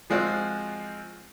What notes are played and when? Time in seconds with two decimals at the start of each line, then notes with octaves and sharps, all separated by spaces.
0.10 F3 G#3 C4 F4 F#4